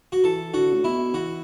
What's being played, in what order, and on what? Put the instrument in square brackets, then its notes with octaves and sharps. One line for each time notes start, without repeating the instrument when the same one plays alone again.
[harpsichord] F#4
[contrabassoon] E3 [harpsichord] A4
[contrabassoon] D3 [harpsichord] F#4
[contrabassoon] A2
[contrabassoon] B2 [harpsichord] E4
[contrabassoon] E3 [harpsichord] F#4